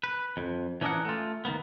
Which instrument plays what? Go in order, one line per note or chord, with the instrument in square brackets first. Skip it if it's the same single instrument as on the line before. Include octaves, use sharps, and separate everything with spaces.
[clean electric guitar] B4
F2
E3 C#4 D4 G#4 A#4 F#5
A3 F4
D#3 A#3 B3